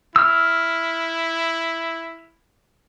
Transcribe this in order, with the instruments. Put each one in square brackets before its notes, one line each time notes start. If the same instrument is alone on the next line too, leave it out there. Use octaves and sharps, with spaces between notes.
[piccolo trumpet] E4 [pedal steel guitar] E6 F6